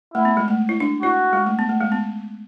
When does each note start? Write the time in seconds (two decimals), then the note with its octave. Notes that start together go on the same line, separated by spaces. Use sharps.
0.14 A3 E4
0.25 B3
0.37 G#3
0.48 A3
0.69 E4
0.80 D4
1.02 E4 F#4
1.33 G#3
1.47 A3
1.59 B3
1.69 A3
1.81 G#3
1.92 B3